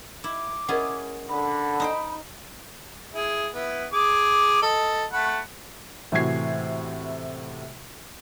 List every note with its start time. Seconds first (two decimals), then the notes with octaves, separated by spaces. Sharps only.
0.24 E4 D6
0.68 C#4 E4 G#4 A#4 D#5 F#5
1.29 D3 B5 D#6
1.80 D#4 C5 G5
3.14 E4 G#4
3.54 B3 E4
3.93 G#4 D6
4.62 A4 D#5
5.13 A3 F#5 B5
6.12 A2 C3 E3 F#4 G#6 C7